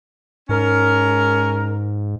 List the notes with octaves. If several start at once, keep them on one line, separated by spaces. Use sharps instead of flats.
G#2 C#4 A#4